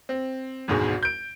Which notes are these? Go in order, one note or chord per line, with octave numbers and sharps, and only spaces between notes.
C4
G#1 D2 G#2 B2 G#3
G6 D7